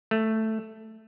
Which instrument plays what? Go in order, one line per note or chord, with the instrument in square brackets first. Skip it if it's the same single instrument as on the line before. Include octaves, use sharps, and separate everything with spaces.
[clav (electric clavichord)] A3